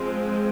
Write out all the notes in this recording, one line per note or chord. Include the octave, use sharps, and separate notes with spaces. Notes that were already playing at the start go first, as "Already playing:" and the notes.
Already playing: F3 G#3 C4